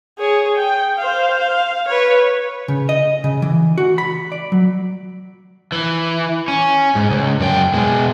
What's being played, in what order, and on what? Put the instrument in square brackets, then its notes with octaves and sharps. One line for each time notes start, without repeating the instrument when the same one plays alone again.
[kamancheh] G#4 C#5
G5
C5 F5
F5
B4 C#5
[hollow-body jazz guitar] C#3
D#5
C#3
E3
F#4
B5
D5
F#3
[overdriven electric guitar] E3
C#4
G#2
C#2
F#2 G5
B2 G#3